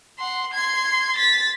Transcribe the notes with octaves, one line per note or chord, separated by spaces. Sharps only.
F#5 C6
C6 G#6
A6 B6